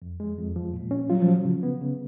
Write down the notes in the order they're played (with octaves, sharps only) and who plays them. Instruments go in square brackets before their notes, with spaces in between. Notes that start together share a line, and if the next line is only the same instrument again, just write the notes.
[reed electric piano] F2
G#3
F2
F3
A#2
C#4
[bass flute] F#3 [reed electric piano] F4
[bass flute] F3
[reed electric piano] F#3
C#3
B3
C#3